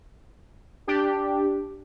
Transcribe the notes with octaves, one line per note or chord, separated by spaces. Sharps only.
D4 G4